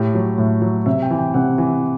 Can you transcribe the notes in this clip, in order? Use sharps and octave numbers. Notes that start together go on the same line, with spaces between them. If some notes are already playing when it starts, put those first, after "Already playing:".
Already playing: A2 G4
F#3
A2
F#3
C3 E5
G5
E3
G5
C3 F#5
E3